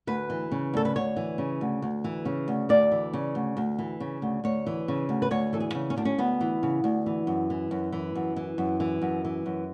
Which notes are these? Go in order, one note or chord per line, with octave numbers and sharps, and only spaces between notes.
D2 B4
E3
C#3
D2 A4
B4
D2 C#5
E3
C#3
D2
D2
E3
C#3
D2
D2 D5
E3
C#3
D2
D2
E3
C#3
D2
D2 C#5
E3
C#3
D2
B4
D2 C#5
E3 A4
G#4
C#3
C#4
D2 D4
C#4
D2 B3
E3
C#3
D2
E3
F#2
E3
F#2
E3
F#2
E3
F#2
E3
F#2
E3
F#2